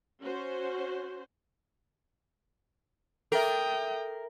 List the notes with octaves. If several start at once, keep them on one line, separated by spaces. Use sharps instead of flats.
C#4 F#4 C5
A4 A#4 E5 G5 D#6